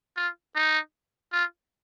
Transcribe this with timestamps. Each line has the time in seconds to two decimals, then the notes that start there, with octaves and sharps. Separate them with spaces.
0.17 F4
0.55 D#4
1.32 F4